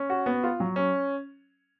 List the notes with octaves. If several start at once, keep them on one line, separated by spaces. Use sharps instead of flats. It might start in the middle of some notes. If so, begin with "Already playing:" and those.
Already playing: C#4
F#4
B3
F4
F#3
C#4